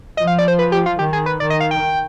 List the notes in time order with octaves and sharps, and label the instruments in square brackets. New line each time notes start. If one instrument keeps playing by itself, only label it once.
[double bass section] F3 [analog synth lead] D#5
[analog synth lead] F5
D5
C5
B4
G4
F4
[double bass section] D#3 [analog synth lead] G4
[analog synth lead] G#4
B4
[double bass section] D#3 [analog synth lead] D5
[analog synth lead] D#5
F5
G5